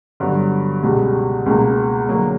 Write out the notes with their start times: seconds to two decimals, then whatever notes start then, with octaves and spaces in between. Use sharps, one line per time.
0.20 G2 D3 F#3 B3
0.83 C#2 B2 G3
1.46 C#2 B2 A#3
2.09 D3 F#3 A#3